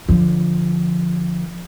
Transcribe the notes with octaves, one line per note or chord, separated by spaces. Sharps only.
D3 F3